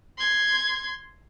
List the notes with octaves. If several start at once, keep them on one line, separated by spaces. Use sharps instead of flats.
C6 G#6